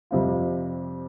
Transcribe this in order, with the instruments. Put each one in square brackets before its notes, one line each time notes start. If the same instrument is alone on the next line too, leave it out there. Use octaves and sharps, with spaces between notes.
[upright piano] F2 C3 G3 C4 F4